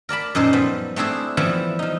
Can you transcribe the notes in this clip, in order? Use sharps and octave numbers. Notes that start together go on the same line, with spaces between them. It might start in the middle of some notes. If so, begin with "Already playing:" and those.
A#4 D5 A5 B5
F#2 A#2 D#4 A4 C5
F3 G3 B3
A3 C4 D4 E4 G#4
E3 F3 G3 B3 E4
F3 D#4